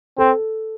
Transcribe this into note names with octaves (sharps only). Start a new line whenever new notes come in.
C4 A4